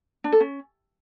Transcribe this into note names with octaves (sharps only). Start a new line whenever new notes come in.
D4
A4
C#4